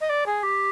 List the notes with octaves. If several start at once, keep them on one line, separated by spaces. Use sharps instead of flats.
D#5
D5
G#4
G4